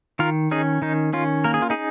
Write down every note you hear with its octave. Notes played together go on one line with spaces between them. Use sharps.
D#3 F4 A#4
C#4 D#4 G#4
D#3 D#4
C#4 F4
A#3 A#4
G#4
F4
D#4 G#4